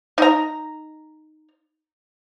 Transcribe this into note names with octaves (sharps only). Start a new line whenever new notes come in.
D#4 A#5